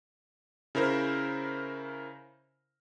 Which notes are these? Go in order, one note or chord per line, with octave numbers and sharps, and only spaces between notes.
C#3 E4 A#4 C5